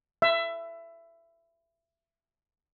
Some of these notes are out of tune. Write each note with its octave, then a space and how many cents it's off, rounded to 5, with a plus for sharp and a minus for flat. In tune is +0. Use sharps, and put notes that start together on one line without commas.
E5 +20